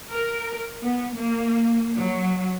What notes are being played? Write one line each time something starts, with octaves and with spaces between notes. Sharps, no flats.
A#4
B3
A#3
F#3